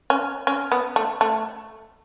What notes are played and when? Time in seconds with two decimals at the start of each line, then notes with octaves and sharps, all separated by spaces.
0.10 C#4
0.47 C#4
0.72 B3
0.96 A3
1.21 A3